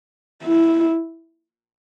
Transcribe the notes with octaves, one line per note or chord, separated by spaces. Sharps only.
E4